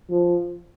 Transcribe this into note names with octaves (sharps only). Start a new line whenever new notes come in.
F3